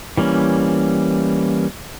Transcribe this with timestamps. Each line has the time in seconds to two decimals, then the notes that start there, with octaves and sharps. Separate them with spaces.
0.17 E3 G3 A#3 C#4